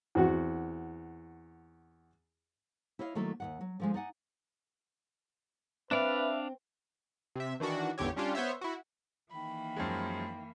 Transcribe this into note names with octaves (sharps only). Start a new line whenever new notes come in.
E2 C4 F#4 F#5
E4 C#5 D#5 F5
D#3 F#3 A3 A#3 E4 A4
D#2 D#3 F#5
F#3
D3 F3 G#3
D#4 D5 F#5 G#5
C4 D4 B4 D5 E5 F5
C3 E5
D#3 E3 D4 F#4
G#1 E2 D3 G4 C#5
G3 C#4 D4 F4 G4
B3 C5 C#5 E5
E4 F#4
D#3 E3 A#3 B5
F#2 F3 G#3